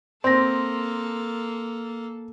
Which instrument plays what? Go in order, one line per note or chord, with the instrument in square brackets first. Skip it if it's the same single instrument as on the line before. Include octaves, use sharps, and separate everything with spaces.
[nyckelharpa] A#3 A4 [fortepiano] C4 [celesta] C6 A#6